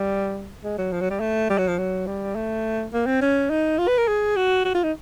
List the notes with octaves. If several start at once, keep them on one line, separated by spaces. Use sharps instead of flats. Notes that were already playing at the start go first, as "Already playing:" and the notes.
Already playing: G3
G#3
F#3
F3
F#3
G3
A3
G3
F#3
F3
F#3
G3
A3
A#3
C4
C#4
D#4
F4
B4
A#4
G#4
F#4
F#4
F4
D#4